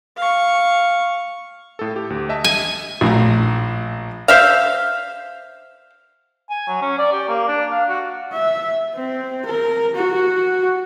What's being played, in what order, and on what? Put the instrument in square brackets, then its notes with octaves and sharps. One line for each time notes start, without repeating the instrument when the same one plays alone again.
[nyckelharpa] F5 C#6
[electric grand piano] A2 A4
G4
D2
D#5 E5 A5
[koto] G#5
[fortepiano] A#1 A2 A#5
[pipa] C5 E5 F5
[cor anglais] G#5
F#3
C#4
D5
G4
A#3
D4
F5
F#4
[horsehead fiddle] E5
C4
A#4
F#4